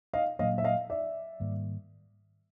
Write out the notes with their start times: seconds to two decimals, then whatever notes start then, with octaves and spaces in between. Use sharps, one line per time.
0.13 D#5 F5
0.39 A#2 F#3 A#3 D4 D#5 F5
0.58 E5
0.64 D#5 F5
0.90 D5 E5
1.40 G#2 D#3 G3 A#3